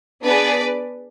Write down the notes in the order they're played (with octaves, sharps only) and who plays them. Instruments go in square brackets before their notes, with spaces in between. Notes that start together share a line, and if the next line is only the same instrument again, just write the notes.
[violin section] B3 D4 G#4 B4 D5